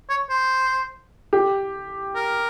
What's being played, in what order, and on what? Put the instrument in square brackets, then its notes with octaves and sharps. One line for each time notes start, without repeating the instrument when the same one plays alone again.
[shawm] C#5
C5
[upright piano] G4
[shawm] A#4